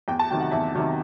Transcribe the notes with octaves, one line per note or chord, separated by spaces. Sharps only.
E2 G5
A5
C3 D#3 F#3 G5
F#5
E2 E5
C3 D#3 F#3